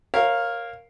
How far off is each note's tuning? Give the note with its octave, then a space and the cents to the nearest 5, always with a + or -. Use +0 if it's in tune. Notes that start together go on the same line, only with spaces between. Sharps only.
A#4 +0 C#5 -25 F5 +0